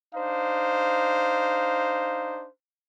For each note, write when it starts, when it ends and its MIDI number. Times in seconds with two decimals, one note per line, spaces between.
0.15 2.48 62
0.15 2.48 63
0.15 2.48 72
0.15 2.48 77